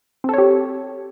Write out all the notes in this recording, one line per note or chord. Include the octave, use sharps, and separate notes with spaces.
C4 G4 A4 C#5